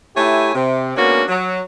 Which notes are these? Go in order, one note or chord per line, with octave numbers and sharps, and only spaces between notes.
A3 E4 G4 C#5 G#5
C3
G#3 A#3 B3 C#4 D4 F#4
F#3